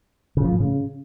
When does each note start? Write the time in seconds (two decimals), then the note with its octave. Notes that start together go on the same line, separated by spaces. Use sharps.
0.37 C#3
0.45 F3
0.52 A2
0.60 C#3